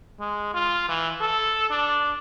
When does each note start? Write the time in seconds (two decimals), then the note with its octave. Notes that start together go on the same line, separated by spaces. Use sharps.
0.20 G#3
0.54 F4
0.88 E3
1.21 A4
1.70 D4